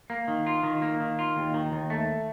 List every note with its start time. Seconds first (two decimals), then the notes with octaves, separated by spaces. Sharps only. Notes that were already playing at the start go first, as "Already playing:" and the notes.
0.10 A#3
0.28 D#3
0.47 F4
0.63 D#3
0.82 A#3
1.00 D#3
1.19 F4
1.37 D#2
1.54 D#3
1.72 D#2
1.90 A3